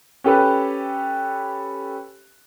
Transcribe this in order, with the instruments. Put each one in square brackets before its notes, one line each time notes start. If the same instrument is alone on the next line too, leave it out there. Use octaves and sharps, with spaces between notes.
[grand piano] C#4 G4 A4 B4